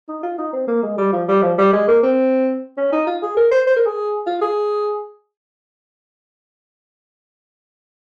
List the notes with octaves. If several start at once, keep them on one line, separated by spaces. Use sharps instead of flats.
D#4
F4
D#4
C4
A#3
G#3
G3
F3
G3
F3
G3
G#3
A#3
C4
C#4
D#4
F4
G#4
A#4
C5
C5
A#4
G#4
F4
G#4